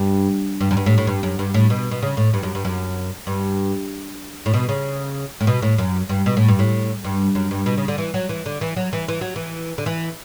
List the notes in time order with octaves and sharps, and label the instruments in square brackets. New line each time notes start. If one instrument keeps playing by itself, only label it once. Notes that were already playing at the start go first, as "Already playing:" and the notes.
Already playing: [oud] G2
G2
F#2
G2
A2
A2
G2
F#2
G2
A2
B2
B2
C#3
A2
G2
F#2
G2
F#2
G2
A2
B2
C#3
A2
B2
A2
F#2
G2
B2
A2
G2
A2
G2
F#2
G2
B2
C#3
D3
E3
F#3
E3
D3
E3
F#3
E3
E3
F#3
E3
D3
E3